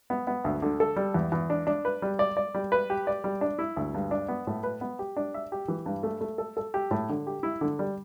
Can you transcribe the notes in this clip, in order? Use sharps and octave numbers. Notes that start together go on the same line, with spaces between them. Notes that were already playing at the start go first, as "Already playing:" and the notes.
B3
B3
D2
D3
A4
G3
E2
E2
D4
D4
B4
G3
D5
D5
G3
B4
G4
D5
G3
D4
E4
D2
G2
D4
B3
A2
B4
B3
G4
D4
E5
G4
E3
G2
A3
A3
A4
A4
G4
A2
D3
G4
E4
D3
G3